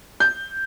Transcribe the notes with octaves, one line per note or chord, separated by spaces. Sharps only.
G6